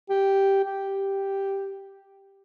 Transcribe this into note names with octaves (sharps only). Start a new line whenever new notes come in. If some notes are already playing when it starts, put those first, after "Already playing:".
G4
G4